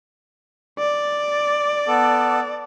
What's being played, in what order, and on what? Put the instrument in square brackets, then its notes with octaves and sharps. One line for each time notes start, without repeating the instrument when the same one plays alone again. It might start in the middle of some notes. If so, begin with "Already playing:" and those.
[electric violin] D5
[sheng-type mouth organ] B3 A4